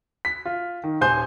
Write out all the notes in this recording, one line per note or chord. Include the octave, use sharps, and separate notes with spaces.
B6
F4
D#3
D#1 C5 G#5 G6